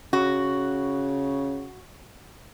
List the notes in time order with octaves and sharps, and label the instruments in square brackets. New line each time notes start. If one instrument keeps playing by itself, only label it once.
[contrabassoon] C#3 [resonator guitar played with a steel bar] F#4